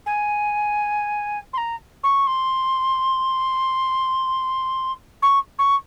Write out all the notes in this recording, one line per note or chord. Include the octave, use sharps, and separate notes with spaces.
G#5
C6
A#5
C#6
C6
C#6
C#6